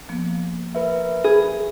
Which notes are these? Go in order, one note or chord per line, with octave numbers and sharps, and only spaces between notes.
F3 A#3 B3
A#4 B4 E5
G#4 B5